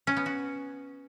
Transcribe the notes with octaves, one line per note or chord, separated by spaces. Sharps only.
C#4
B3
F#4